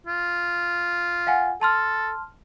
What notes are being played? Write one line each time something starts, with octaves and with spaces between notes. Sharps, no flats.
F4
F5 F#5 G#5
A4 A5 C6 F6